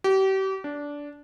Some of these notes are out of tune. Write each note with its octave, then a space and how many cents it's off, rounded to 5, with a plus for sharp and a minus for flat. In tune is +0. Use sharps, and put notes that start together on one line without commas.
G4 -35
D4 -15